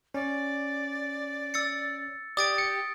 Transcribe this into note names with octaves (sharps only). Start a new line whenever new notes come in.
C#4 D5
E6 A6 C#7
G4 D5 D#6 A6 D7
C#7